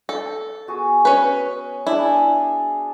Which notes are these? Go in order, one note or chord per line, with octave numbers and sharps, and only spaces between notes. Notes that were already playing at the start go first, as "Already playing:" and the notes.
A4
B3 F#4 G#4
C#4 B4
D4 E4 G#4